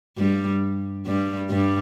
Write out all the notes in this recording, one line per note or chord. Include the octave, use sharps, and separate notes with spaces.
G2 G3
G2 G3
G2 G3